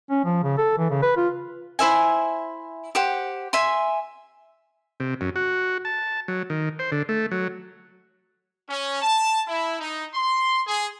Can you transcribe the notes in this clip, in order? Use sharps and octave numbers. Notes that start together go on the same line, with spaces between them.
C#4
F3
C#3
A4
E3
C#3
B4
F4
E4 C5 E5 G#5
G4 C5 F#5
E5 G#5 C6
C3
F#2
F#4
A5
F#3
D#3
C5
D3
A3
F#3
C#4
A5
E4
D#4
C6
G#4